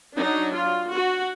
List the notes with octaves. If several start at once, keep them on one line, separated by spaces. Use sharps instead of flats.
F#3 D4 D#4
F4
F#4